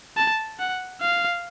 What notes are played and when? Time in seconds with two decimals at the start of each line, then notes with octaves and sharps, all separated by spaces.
0.17 A5
0.59 F#5
1.01 F5